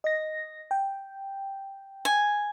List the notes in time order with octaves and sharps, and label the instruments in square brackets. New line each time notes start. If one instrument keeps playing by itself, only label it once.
[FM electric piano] D#5 A#6
G5
[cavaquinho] G#5